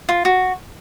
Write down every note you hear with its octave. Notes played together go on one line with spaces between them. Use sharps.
F4
F#4